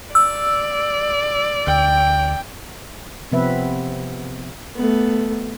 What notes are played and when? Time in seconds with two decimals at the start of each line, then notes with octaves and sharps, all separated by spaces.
0.15 D5 E6
1.67 D2 G5
3.32 C3 F3 B3 C4 B4 E5
4.76 A3 B3